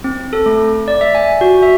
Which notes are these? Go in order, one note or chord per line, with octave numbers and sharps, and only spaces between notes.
C4
A4
A3
D5
E5
G#5
F#4
E5